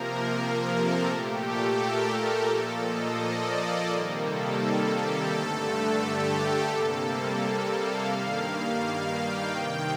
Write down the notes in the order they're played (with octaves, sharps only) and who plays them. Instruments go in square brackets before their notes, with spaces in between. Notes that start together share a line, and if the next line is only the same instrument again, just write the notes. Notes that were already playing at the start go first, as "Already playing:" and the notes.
Already playing: [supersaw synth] C3 F3 A#3 A#4
A#4
A4
A#2 A3 G4
A4
A#4
G4
A#2 F3 A#3 A4
D#5
D5
C3 D#3 G3 A#3
A4
G4
G2 D3 A3 A4
G4
C3 G3 A#3 A4
A4
F5
G2 D#3 G3 A#3
F5
G5
C3 D#3 A#3 G5